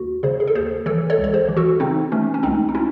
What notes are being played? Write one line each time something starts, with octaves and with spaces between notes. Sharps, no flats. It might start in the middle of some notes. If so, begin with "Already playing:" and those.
Already playing: D#2 F#4
C#3 G#4 C5
G#4
A4
D#2 G#4 C5
E3 A4 C#5
A4 C#5
C#2
C#5
G#4 C5
E3
F#4 A4
C#3 C4 D#4
E3 A3 C#4
C#4
C#2 C4 D#4
D#4
C#4 E4